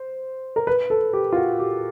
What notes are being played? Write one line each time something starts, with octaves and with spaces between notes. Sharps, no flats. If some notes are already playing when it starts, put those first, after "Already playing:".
Already playing: C5
A#4
B4
A4
G4
F4
F#4
G4